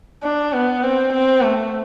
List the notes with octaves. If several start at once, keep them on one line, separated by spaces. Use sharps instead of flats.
D4
B3
C4
C4
A3